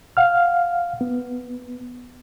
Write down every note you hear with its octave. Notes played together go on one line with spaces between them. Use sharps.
F5 F#5 F6
B3